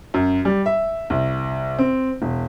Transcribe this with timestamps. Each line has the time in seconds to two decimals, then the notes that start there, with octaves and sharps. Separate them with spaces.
0.14 F#2
0.45 G3
0.66 E5
1.10 C2
1.79 C4
2.22 E1